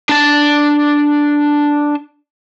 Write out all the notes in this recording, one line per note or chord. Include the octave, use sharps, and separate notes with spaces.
D4 A5